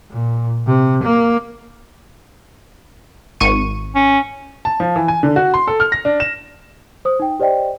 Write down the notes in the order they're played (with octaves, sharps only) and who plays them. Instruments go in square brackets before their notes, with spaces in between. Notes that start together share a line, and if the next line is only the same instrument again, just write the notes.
[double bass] A#2
C3
A#3
[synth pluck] G#1 C#6 D#7
[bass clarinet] C#4
[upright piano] A5
F3
E3
G#5
D3
F#4
C6
A4
F6
A#6
D4
E7
[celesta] C5 D#6
D#4 G5
G4 C5 D5 D#5 G5